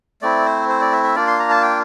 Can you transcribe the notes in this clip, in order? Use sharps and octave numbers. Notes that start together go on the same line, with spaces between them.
A3 C4 E4 D5
C5
C5
D5
E5
E5
A#3 D4 F4 D5
C6
A#5
A5
G5